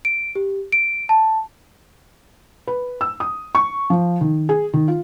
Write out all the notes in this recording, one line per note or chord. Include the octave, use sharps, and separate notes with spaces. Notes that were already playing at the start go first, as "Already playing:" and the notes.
D7
G4
D7
A5
B4
E6
D#6
C#6
F3
D#3
G#4
D#3
F4